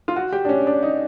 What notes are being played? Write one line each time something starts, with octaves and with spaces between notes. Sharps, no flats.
F4
F#4
G4
D4
C#4
D4
D#4